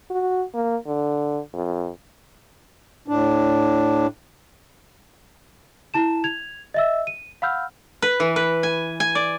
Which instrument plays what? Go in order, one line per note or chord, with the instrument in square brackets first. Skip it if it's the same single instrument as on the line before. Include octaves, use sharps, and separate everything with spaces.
[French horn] F#4
A#3
D3
F2
[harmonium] A2 D4
[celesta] E4 A5 E7
G#6 F7
D#5 E5 E6
D#7
F5 F#5 B5 E6 F6 G6
[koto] B4
E3
B4
G#5
G#5
D5